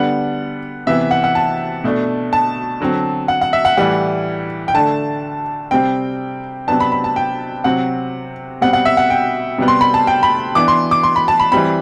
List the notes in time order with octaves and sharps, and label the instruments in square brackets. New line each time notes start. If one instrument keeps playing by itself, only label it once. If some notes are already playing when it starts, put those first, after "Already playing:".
Already playing: [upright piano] D3 G3 B3 D4 F#5
C3 E3 B3 E5
F#5
F#5
A5
B2 A3 D4
A5
D3 F#3 C4
F#5
F#5
E5
F#5
A2 E3 G3 F#5
G5
D3 A3 D4 A5
C3 G3 C4 G5
C3 F#3 B3 D4 A5
B5
B5
A5
G5
C3 F#3 C4 F#5
B2 G3 C4 F#5
F#5
E5
F#5
G5
C3 G3 B3
C6
B5
A5
G5
B5
E3 B3 D4 D6
C6
D6
C6
B5
A5
B5
E3 G3 C4 B5